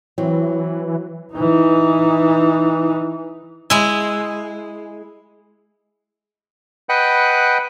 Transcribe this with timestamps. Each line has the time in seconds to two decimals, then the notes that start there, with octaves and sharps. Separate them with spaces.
0.18 E3 F#3 C4
1.34 E3 D#4
3.70 G#3 E4
6.89 B4 D#5 F#5 G5 F#6